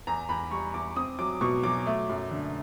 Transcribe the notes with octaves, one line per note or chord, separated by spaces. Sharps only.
E2 A#5
E2 B5
G3 C#6
E2 D6
C4 D#6
F#3 D6
B2 C#6
F#3 D6
A3
F#2
D3